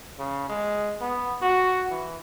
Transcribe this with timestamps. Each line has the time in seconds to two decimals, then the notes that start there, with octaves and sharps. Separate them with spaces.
0.19 C#3
0.49 G#3
1.01 B3
1.42 F#4
1.90 E3